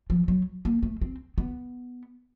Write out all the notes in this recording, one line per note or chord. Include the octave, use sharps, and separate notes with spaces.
F3
F#3
A#3
A3
C4
B3